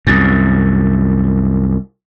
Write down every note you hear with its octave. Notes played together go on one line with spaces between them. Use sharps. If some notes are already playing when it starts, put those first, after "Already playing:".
C2 F#2